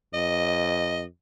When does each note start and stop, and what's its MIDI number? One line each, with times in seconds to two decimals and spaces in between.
0.14 1.04 41
0.14 1.01 75